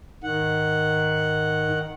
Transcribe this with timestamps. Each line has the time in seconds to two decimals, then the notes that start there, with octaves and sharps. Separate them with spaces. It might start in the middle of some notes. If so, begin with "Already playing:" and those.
0.23 G#2 D#3 F#5